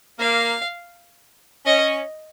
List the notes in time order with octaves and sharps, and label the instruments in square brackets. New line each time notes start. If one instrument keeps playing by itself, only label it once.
[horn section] A#3 [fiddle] F5
[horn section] C#4 [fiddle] D#5